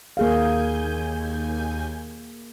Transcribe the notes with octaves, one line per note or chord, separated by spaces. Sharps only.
D#2 A#3 G#4 F5 G#5 G6